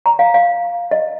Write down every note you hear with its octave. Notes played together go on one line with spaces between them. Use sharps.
A#5
F5
F5
D#5